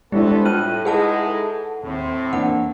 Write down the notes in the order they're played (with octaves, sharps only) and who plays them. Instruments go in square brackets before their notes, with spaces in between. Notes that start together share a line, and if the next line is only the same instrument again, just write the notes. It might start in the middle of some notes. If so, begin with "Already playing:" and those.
[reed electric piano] G3 D4 E4 [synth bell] G#3 [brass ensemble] B3 A4 C5
[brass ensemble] A2 [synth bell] F4 D#7 [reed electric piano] G5 F6 F#6
[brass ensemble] G#3 D#4 E4 [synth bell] G#4 F#5 A5 [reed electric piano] B4
[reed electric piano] A4
[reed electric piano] D#2 [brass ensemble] A2 C4
[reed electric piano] E2 A#3 D4 [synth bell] F#5